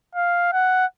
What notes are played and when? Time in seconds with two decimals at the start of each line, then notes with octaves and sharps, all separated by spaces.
0.15 F5
0.53 F#5